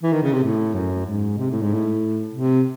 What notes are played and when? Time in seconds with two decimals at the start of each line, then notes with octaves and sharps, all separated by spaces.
0.03 E3
0.12 D#3
0.23 C#3
0.33 C3
0.43 A2
0.75 F#2
1.06 G#2
1.38 C3
1.50 A2
1.62 G#2
1.74 A2
2.33 C3